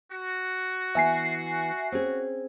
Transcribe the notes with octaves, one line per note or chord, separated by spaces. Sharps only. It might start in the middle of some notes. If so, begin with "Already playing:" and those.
F#4
E3 B3 E5 G#5 C7
C4 C#4 G#4